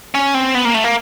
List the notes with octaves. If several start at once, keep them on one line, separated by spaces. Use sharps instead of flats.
C#4
C4
B3
A#3
A3
A#3